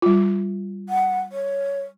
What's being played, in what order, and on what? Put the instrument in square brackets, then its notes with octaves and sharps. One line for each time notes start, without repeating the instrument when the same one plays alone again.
[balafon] G3 F4
[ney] F#5
C#5